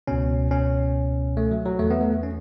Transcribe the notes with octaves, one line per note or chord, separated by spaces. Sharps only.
C#2 B2 C#4
C#4
A3
F#3
F#3
E2 E3 A3
B3
A3
C#4